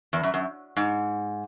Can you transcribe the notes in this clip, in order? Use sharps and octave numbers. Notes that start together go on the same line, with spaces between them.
E2
F#2
F#2
G#2